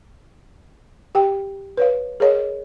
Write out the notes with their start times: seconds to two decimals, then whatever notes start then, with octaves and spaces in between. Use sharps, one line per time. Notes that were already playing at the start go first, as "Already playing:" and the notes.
1.15 G4 G5
1.77 B4 C#5 F5
2.20 G#4 A#4 C#5 D#5